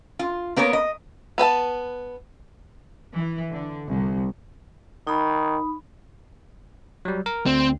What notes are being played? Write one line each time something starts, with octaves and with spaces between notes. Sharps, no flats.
F4
A#3 B3 A#4 C#5
D#5
B3 B4 G5 A5
E3
D3
C2
D#3 D#4 B5
F#3 G3
A#4
D2 C4